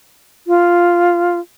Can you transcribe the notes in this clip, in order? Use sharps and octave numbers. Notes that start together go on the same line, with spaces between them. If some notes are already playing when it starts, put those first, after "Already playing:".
F4